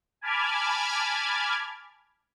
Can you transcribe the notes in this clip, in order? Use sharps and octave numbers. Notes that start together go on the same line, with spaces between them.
G#5 A5 B5 D6 F6 G#6